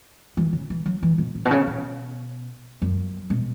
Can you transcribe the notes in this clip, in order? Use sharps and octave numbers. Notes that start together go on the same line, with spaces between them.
E3
C#3
E3
F#3
E3
B2
A2
B2
C#3
B2
F#2
B2